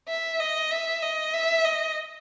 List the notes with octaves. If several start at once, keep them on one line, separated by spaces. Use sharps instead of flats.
E5
D#5
E5
D#5
E5
D#5